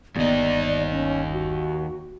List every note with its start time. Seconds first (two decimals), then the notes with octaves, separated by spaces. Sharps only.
0.16 G1 D#2 D#4 D5
0.92 C#4
1.33 F#4